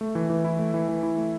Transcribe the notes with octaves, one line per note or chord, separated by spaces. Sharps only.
A3
E3
E3
E4
A3
E3
E3
E4
A3